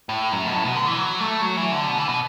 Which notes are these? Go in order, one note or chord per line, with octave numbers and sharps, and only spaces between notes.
A2
F#2
B2
A2
B2
D3
E3
F#3
A3
F#3
E3
D3
B2
E3
B2